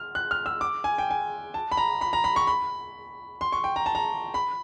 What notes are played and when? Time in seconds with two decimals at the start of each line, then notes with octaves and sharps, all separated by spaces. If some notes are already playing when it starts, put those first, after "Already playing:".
Already playing: F6
0.15 F#6
0.31 F6
0.46 E6
0.61 D6
0.84 G#5
0.98 G5
1.10 G#5
1.54 A5
1.72 B5
1.77 A#5
2.01 B5
2.13 A#5
2.24 B5
2.36 C#6
2.47 B5
3.41 C6
3.52 C#6
3.64 G5
3.76 A#5
3.86 A5
3.95 A#5
4.34 B5